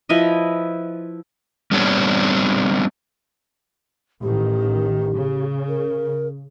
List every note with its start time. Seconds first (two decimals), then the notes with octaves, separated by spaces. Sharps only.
0.09 F3 E4 B4 D#5
1.71 G3 B3 C4 D4 C#5
4.23 A1 D#3 G4
5.14 C#3
5.68 A#4